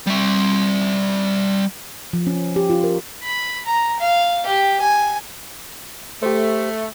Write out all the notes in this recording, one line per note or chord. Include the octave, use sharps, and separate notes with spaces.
G3 E5
F3
C#4
G4
F4
A#4
B5
A#5
F5
G4
G#5
A3 G4 C5